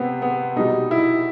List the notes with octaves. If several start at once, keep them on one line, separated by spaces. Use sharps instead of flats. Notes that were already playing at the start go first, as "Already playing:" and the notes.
Already playing: C3 B3 C4
B3
B2 G3 D#4
E4